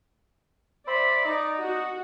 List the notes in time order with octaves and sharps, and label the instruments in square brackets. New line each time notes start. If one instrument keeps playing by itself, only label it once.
[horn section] C5 E5 B5 [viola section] D5
[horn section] D#4
[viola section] F#4